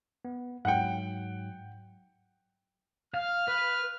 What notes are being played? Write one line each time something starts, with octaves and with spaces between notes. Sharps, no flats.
B3
G#2 F#3 F#5 G5 C#7
F5 F6
B4